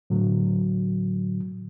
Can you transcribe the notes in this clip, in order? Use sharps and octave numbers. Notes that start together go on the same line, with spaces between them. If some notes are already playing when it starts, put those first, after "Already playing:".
A2 D3 F#3